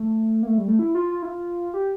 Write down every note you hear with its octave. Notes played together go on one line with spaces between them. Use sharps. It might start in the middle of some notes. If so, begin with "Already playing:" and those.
Already playing: A3
A#3
A3
G3
A3
E4
F4
F4
E4
F4
G4